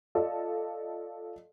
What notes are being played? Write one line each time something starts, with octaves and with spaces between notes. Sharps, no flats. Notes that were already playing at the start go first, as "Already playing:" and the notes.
F4 A4 D5 D#5